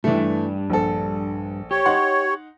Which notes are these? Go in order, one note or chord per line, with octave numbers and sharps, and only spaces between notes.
G2 E3 A3 D4
A#1 A4
G4 C#5
D#4 F#5 C6